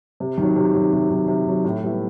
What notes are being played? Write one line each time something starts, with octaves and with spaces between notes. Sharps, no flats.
C3
D#3 F#3
C3
D#3 F#3
C3
D#3 F#3
C3
D#3 F#3
A2
G3 B3 E4